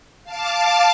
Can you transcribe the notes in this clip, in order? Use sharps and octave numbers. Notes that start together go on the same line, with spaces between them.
F5 A5 D6